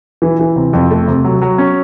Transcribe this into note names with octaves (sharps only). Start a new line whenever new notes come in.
E3
E3
C3
F2
A3
C3
F#3
F#3
C#4